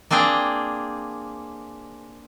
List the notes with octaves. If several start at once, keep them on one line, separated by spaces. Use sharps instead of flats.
A#3 C4 D4 G#4 G5